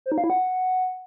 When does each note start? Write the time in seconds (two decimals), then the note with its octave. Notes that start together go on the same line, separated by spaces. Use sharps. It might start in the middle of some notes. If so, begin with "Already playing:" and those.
0.06 C5
0.12 D#4
0.18 F5
0.24 E4
0.30 F#5